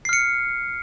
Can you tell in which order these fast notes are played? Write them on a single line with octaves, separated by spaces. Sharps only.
C7 F6 C#7